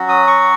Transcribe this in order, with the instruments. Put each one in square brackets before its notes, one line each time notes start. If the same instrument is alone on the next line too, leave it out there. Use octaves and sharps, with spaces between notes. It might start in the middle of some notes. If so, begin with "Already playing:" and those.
Already playing: [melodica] F#3 C#4 F#4
D#6
C#6